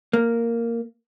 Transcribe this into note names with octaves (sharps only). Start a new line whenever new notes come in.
A#3